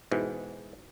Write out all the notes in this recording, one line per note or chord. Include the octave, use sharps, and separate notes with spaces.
G#2 B2 E3